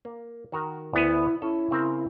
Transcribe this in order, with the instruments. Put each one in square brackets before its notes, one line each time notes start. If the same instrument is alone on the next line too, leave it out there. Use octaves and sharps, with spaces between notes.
[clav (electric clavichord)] A#3
D#3 F#4 A#4
[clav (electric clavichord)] D2 B3 G#5 [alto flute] E4
[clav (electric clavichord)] C#4 A4 [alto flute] E4
[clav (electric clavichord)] C#3 C4 A#4